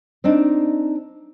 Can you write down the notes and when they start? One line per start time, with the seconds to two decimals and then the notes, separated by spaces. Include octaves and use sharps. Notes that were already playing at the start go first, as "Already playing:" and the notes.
0.24 C4 D4 D#4